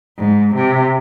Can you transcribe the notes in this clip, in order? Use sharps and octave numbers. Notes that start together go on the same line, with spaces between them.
G#2
C3